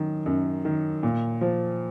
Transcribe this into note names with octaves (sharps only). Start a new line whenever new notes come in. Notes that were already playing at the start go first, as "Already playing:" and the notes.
Already playing: F#2 D#3
F#2
D#3
A#2
F3